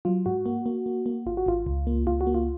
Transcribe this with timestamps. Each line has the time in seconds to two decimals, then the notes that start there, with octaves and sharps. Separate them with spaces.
0.05 F#3 F4
0.26 G#2 F#4
0.46 A#3
0.66 A#3
0.86 A#3
1.06 A#3
1.26 G#1 F4
1.37 F#4
1.46 G#1 F4
1.67 C#2
1.87 A#3
2.07 C#2 F4
2.21 F#4
2.27 A#3
2.34 F4